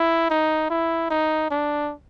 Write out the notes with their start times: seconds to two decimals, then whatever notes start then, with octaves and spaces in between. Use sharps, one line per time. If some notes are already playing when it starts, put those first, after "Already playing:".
Already playing: E4
0.30 D#4
0.70 E4
1.10 D#4
1.50 D4